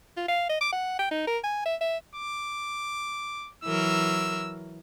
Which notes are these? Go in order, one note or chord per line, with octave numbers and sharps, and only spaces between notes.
F4
F5
D#5
D6
F#5
G5
D#4
A#4
G#5
E5
E5
D6
E3 F#3 A#4 E6